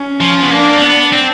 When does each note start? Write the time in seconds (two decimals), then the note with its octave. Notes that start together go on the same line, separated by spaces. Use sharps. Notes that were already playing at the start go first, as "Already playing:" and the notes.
Already playing: C#4
0.21 F3
0.43 B3
0.51 A#3 D4
0.76 C4
0.82 B3
1.12 C4